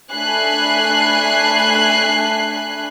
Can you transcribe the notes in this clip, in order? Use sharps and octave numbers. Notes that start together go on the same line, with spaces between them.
A3 D4 G#5 B5 F#6 C7